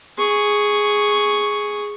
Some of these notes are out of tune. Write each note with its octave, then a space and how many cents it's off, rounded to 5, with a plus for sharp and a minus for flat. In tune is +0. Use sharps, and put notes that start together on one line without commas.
G#4 +0 C#6 +0